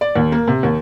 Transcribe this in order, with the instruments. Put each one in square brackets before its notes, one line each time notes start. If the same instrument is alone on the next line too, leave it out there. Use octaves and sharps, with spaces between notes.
[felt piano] D5
D#2
A#3
C3
D#2